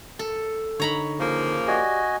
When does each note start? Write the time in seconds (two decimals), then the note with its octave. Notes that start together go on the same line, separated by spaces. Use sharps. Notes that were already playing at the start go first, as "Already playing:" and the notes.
0.19 A4
0.80 D3 D#4 C#5 A#5 B5
1.19 C#3 F3 A#3
1.68 F#4 G4 D5 D#5 G#5